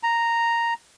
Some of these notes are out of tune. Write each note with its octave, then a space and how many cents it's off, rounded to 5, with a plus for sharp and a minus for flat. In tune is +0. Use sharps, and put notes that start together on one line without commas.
A#5 -5